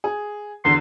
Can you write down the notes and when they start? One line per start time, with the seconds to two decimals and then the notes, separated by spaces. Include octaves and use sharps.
0.04 G#4
0.65 E2 D3 C6